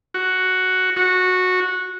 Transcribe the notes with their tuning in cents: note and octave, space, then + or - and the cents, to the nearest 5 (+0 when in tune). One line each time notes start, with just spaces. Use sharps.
F#4 +5
F#4 -10